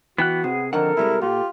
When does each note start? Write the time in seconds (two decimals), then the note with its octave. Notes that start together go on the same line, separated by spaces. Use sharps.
0.18 E3 B3 F#4 G5 F#6
0.44 C3 B3 G#4
0.73 F2 D3 D#3 A4 A#4 F#5
0.97 C3 G3 G#3 E4
1.21 A#2 F4 G4